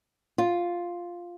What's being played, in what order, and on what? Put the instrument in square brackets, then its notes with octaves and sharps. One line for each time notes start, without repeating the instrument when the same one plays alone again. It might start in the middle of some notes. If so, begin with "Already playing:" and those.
[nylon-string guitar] F4